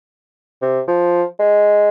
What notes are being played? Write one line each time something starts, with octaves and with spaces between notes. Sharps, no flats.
C3
F3
G#3